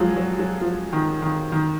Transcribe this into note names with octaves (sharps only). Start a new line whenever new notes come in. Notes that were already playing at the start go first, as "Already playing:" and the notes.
Already playing: F3 F#3 G#3
F#3
F#3
F3
D#3
D#3
D#3